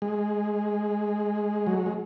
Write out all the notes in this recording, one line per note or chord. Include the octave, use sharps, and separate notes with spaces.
G#3
F#3
G#3